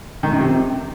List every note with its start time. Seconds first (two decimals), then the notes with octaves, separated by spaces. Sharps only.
0.23 D#3
0.32 F#2
0.40 C3